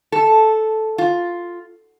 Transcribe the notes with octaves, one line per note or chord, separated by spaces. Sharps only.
A4
F4